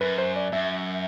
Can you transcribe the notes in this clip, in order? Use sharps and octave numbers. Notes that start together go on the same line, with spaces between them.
F#2 B4
C5
D5
F#2 E5